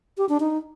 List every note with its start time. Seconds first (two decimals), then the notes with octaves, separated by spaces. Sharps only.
0.18 G4
0.29 D4
0.40 D#4